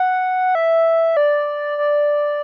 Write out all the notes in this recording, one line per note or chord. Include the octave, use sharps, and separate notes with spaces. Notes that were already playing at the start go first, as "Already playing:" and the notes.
Already playing: F#5
E5
D5
D5